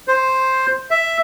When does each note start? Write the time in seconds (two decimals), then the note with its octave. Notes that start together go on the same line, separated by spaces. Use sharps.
0.08 C5
0.91 E5